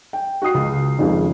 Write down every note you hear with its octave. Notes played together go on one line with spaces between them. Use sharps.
G5
F#4 G5 D#6 C7
C#2
G#1 F2 C#3